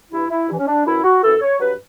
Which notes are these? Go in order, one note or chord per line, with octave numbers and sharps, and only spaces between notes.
G2 E3 E4
E4
G2 E3
C#4
D4
F#2 E3 E4
F#4
F#2 E3 A4
C#5
G2 F#3 B4